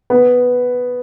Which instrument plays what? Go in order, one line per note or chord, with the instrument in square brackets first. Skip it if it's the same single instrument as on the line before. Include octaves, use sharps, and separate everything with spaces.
[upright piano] B3